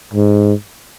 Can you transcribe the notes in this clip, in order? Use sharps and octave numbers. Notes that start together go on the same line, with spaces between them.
G#2